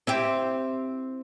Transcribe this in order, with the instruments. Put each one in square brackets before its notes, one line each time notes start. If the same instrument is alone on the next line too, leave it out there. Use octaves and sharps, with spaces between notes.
[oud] C4 E4 G4